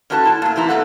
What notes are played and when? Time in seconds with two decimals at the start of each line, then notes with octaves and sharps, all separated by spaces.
0.10 A2 C#4 D4 F#4 A4 A5
0.25 E4 A5
0.42 A#2 A3
0.56 C3 E3 E4 A#5
0.69 B2 E3 A3 A4 F#5